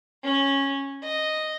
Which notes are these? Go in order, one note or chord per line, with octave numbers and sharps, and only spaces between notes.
C#4
D#5